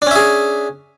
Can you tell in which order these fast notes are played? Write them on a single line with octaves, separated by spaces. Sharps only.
D4 C#4 E5 G#4